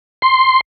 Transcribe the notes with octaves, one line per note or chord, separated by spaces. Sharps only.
C6